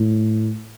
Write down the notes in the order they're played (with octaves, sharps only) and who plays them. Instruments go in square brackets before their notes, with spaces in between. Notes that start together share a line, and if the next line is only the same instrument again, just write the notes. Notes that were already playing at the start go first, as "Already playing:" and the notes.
Already playing: [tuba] A2